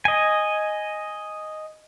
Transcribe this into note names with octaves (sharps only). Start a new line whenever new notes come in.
D#5 G#5